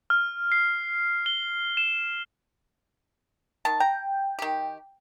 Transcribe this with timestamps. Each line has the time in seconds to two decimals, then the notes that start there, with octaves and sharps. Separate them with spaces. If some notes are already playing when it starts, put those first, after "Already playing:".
0.10 F6
0.52 C7
1.26 G7
1.77 E7
3.65 D#3 A5
3.80 G5 A#5
4.39 D#3 G4